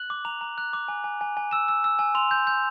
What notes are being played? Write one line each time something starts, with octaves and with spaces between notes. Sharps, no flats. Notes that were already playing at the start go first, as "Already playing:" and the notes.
Already playing: F#6 F#7
D6
A#5 F7
A#5
F#6
D6
G#5
G#5
G#5
G#5
E6 E7
E6
E6
G#5
C6 F7
G6
G6